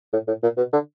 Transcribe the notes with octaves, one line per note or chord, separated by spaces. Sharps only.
A2
A2
A#2
B2
D3